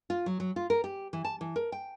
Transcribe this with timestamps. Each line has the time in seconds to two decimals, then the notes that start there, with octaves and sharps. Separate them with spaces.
0.10 F4
0.26 F#3
0.40 F#3
0.56 F4
0.70 A#4
0.84 G4
1.13 E3
1.24 A5
1.41 E3
1.56 A#4
1.72 G5